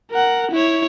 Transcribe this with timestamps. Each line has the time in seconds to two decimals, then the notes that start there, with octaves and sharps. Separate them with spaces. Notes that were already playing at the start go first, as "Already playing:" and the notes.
0.11 A#4 F#5
0.51 E4 C#5